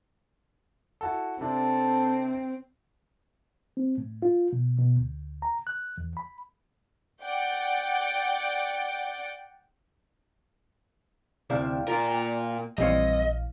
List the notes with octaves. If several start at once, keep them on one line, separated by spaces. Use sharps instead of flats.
E4 F#4 A4
C3 C4 D4 A4
C4
A2
F4
B2
B2
D2
A#5
F#6
E2
B5
D5 F#5 G5
D2 C3 E4 D5 F5 G5
A#2 F4 A#4
A#1 E3 G3 C4 C#5 D#5 F5